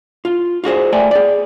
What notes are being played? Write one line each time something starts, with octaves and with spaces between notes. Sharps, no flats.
F4
F4 F#4 G#4 C5
A3 D5 G5 G#5
G#4 D5